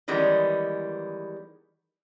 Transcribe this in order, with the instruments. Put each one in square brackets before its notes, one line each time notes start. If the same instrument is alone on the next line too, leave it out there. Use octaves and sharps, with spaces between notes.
[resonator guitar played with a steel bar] D#3 E3 G3 G#3 B3 C#4